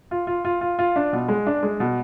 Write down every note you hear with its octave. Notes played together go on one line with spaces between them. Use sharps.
F4
F4
F4
F4
F4
D4
B2
G#3
D4
G#3
B2